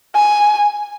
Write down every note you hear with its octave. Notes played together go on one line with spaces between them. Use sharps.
G#5